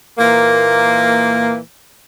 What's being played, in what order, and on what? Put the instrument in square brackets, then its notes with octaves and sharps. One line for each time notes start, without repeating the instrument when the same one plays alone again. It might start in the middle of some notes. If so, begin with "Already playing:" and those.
[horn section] A#2 E3 A#3